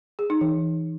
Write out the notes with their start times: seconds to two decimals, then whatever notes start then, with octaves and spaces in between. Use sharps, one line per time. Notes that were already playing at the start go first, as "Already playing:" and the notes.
0.19 G#4
0.30 D#4
0.41 E3